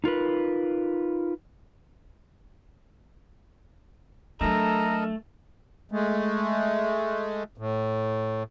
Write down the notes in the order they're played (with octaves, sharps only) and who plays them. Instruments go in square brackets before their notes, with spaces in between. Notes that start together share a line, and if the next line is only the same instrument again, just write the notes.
[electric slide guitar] D#4 F4 A#4 B4
[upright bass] F#3 D4 [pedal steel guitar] A3 [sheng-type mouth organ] A4 A#4 D#5 [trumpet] A#5
[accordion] G#3 A3
A2